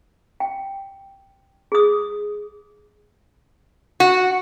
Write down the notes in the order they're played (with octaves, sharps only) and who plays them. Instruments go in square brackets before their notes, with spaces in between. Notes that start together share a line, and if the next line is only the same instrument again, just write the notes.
[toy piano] G5
G#4 D#6
[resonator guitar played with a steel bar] F#4